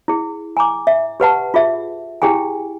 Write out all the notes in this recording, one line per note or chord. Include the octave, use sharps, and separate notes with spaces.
E4 G#4
G#5 A#5 D6
E5
G4 B4 F#5 A5
F4 G#4 E5
E4 G4 G#4 G5 G#5